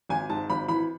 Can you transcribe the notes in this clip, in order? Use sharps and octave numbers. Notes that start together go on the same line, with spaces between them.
G#1 G#5
G#2 A5
G#1 B5
E3 B5